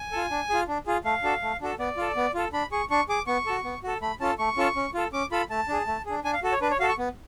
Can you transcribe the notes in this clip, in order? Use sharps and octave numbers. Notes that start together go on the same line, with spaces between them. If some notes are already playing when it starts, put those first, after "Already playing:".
Already playing: G#5
F4 A4
D4
F4 G#4
D4
F4 G#4
A3 F5
D4 F#4 A4
A3
D4 F#4 A4
B3 D5
F4 A4
B3
F4 A4
D4 B5
G#4 C#6
D4 C#6
G#4 D6
B3 C#6
F#4 A4
B3
F#4 A4
A3 B5
C#4 F4 A4 A5
A3 C#6
C#4 F4 A4
C#4
F4 A4
C#4 D6
F4 A4 B5
A3 A5
D4 G#4
A3
D4 G#4
D4 G#5
F5
F#4 A4
C#5
D4 B4
C#5
F#4 A4 F5
C#6
B3